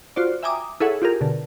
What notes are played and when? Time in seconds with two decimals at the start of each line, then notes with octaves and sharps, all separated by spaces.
0.16 F4 F#4 C5 D5
0.43 E5 G5 G#5 A#5 D6 D#6
0.80 E4 G#4 A4 C#5 E5 F#5
1.02 F4 G4 G#4 A#4
1.21 B2 D3